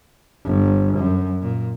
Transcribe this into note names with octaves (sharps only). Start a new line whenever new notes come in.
G1
F#2
A#2